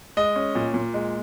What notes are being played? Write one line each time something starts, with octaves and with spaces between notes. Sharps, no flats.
G#3 D#5
C#4
A#2
A#2
G#3